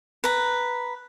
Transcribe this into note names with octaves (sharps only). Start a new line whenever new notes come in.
B4 A#5